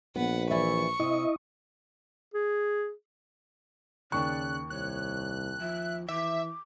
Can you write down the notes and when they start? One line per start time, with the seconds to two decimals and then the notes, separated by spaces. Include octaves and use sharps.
0.16 A#1 B3 B4 F#5
0.50 E3 D5 E5 C#6
1.00 C3 E4 D#5
2.34 G#4
4.12 D#2 C#3 D5 C#6 F#6
4.70 C2 C#5 F#6
5.61 F3 E5
6.08 E3 E5 D6